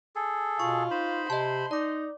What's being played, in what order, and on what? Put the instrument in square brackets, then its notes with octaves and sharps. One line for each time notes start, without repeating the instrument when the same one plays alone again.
[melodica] G#4 A4
[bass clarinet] B2 [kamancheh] F4 [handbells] C#6
[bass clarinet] D#4 [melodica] C5 B5
[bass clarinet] C3 [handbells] D#5 A5 [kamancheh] C6
[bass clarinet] D#4 [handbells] D5 D6